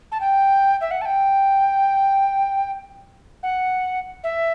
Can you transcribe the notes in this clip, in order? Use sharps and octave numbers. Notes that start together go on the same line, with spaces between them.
A5
G5
E5
F#5
A5
G5
F#5
E5